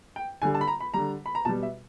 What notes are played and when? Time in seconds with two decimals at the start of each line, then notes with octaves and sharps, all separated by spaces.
0.16 G5
0.42 D3 G3 G#5
0.55 A5
0.61 B5
0.68 A#5
0.81 B5
0.94 D3 G3 A#5
1.26 B5
1.35 A#5
1.45 B2 G3 A5
1.63 E5